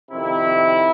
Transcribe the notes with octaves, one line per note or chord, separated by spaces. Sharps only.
F2 C3 D#3 E4